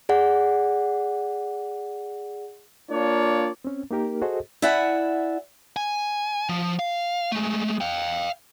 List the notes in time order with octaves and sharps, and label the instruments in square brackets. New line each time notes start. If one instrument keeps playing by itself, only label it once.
[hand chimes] G#4 D5 F#5
[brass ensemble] A#3 D4 F4 C#5 D5
[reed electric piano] C4 C#4
A#3 D#4 G4 A#4
F#4 G#4 A4 C5 D#5
[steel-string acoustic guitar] E4 D5 E5 F#5 G#5
[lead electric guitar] G#5
F3
F5
G#3 A3
F5 G5